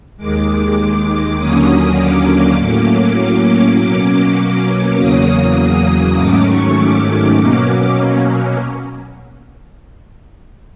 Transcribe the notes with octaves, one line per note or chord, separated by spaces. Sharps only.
D#2 D#3 G#3 D6
D6
D#2 D3 F#3 A#3 C#4 D#6
D6
A2 F#3 A#3 C#4
B2 F#3 A#3 C#4 D6
D6
E2 C#3 F#3 A#3 D#6
G#2 D#3 F#3 A3 C#4 D6
C#6
D6
B2 F#3 A#3 C#4